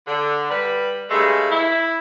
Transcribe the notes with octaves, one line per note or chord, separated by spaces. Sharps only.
D3
G3 B4
G2 C#3 G#3 A3
E4